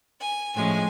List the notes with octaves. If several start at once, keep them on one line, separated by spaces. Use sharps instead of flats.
G#5
A2 F3 G#3 C#4 G#5